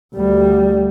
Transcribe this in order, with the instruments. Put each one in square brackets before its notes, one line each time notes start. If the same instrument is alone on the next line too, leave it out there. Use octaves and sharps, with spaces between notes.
[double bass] D2 G3